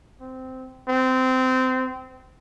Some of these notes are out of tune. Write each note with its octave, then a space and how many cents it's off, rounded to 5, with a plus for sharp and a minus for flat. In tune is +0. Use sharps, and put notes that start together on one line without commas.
C4 -15
C4 -20